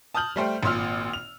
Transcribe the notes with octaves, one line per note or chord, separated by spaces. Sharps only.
A5 D#6 F6 G6 F#7
G3 A3 C5 G5
G#1 A#2 C6 E6 F6
F7